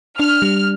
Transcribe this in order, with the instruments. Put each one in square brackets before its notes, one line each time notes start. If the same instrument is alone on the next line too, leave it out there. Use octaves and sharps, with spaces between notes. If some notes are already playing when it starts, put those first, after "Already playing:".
[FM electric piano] D4 [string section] F6
[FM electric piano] G3